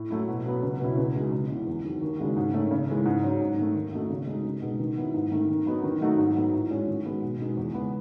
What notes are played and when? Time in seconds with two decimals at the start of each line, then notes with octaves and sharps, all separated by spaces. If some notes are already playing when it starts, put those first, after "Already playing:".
Already playing: A2
0.10 F#3 A3 E4
0.28 B2
0.45 F#3 B3
0.63 C#2
0.80 B2 F#3 C#4 E4
0.97 C#2
1.15 B2 G#3 D#4 F#4
1.32 C#2
1.50 C#3 E3 B3
1.67 E2
1.84 D#3 F#3
2.02 D#2
2.19 C#3 G#3 D#4 F#4
2.36 G#2
2.54 D#3 A3 C#4
2.71 C#3
2.89 E3 G#3
3.06 G#2
3.23 F#3 C#4
3.41 G#2
3.58 D#3 A3
3.75 D#2
3.92 D#3 A3 D#4 F#4
4.10 C#3
4.27 G#3 D#4 F#4
4.44 C#2
4.62 B2 G#3 D#4
4.80 D#3
4.97 F#3 B3 E4
5.14 G#2
5.32 D#3 A3
5.49 D#3
5.66 F#3 B3 D#4 F#4
5.83 D#3
6.01 F#3 A3 D#4 F#4
6.18 G#2
6.35 F#3 B3
6.52 A2
6.70 G#3 C#4 F#4
6.88 D#3
7.05 G#3 B3 F#4
7.22 B2
7.40 G#3 D#4 F#4
7.57 E2
7.74 C#3 G#3 B3